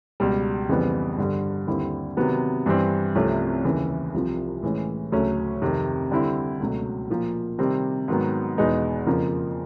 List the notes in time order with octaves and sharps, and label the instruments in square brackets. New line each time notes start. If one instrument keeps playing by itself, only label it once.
[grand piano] C#2 B2 G3
F2 C#3 E3 G3 B3
G2 D3 G3
D#2 D3 G3 C4 E4
C3 D#3 F#3 B3
G2 E3 G3 C4
C2 C3 F3 A3 C#4
D#2 C#3 E3
C2 C3 F3
A2 E3 G#3 C#4
D2 C#3 F#3 A3 C#4
F2 C3 D#3
D3 G3 C4 E4
C#2 B2 F#3 A3
A#2 F3 A#3
C3 D#3 G3 C4
G#2 D#3 F#3 B3
E2 B2 G#3 B3 D#4
F2 C#3 F3 A#3